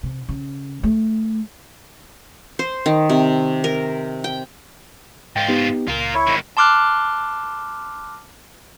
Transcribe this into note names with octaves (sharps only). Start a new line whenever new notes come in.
C3
C#3
A3
C5
D#3
C3
A#4
G5
G#2 F4 G5
B3 D#4 G4
C#2 F4 A#4
E4 C#5
G#2 D#3
A5 C6 D6 F6 F#6